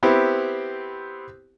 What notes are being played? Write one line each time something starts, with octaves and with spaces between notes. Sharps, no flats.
B3 C4 E4 G4